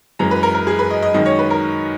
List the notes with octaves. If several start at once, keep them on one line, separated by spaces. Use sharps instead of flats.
F#2 E3 G#3 A#5
B4
A#4
A#4
G#4
B4
D#5
D#5
F#2 D#3 G#3 D#5
C#5
B4
A#4